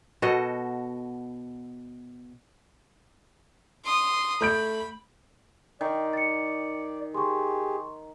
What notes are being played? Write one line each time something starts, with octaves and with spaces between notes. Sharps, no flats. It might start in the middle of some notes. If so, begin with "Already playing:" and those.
B2 F#4 A4 D#5
C6 D#6
A3 B5 G6 D7
D#3 D5
A6 C#7
G4 G#4 C6 C#6